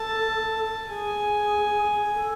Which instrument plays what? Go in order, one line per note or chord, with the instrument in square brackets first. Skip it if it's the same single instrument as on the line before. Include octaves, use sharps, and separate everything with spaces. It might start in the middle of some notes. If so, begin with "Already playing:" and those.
Already playing: [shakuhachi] A4 [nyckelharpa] A5
[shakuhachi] G#4 [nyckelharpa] G#5
[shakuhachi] A4